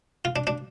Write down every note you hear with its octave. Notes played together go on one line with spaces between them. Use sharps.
F4
D4
D4